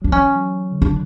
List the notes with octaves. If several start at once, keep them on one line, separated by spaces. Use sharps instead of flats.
F#3 D4
E3 C#4
F#3
D3
C#3 D4